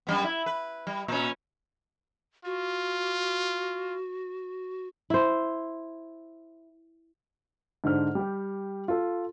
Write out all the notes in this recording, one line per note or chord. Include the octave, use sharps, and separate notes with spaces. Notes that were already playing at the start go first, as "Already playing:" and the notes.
F#2 G3 B3
E4
B4
G3
A#2 C#4
F4 F#4
E4 C5
G#2 D3 D4 C5 F6
G3 G4
F4 A4